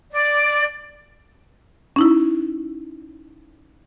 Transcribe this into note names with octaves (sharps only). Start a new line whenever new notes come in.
D5
C#4 D#4 E4